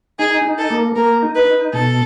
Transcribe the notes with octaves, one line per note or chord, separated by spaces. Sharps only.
D#4 G#4
D#4
A4
A#3
A#3 A#4
D#4
B4
D#4
B2 A4